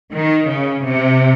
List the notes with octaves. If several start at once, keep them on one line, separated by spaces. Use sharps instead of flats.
D#3
C#3
C3